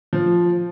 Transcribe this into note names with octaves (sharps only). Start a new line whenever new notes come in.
F3